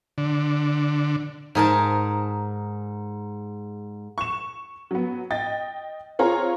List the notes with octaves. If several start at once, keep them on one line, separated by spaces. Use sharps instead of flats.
D3
G#2 G#4 A#4 A5
C#6 E7
F#3 B3
D#5 G5 A6
C4 F4 G#4 C#5 A#5